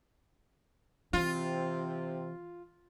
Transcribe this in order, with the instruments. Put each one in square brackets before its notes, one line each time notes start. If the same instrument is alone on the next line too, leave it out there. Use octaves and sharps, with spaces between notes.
[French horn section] C3 C4 [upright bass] E3 [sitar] F4